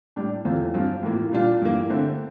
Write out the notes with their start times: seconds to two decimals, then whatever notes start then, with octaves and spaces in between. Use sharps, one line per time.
0.16 A2 G3 D4
0.45 E2 E3 A3 C4 F4
0.74 G2 F3 C4 F4
1.03 A2 E3 A#3 F4
1.32 A#2 G3 D4 F4
1.61 G2 E3 A#3
1.90 D3 A3 C4